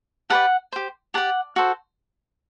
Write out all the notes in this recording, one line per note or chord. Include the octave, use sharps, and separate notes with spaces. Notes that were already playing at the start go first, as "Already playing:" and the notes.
G4 B4 D5 F#5 A5
G4 C5
G4 D5 F#5 A5
F#4 A4 C5